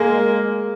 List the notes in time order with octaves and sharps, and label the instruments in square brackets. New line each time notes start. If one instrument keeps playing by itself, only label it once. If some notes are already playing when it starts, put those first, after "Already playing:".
Already playing: [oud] G#3 [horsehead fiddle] A#3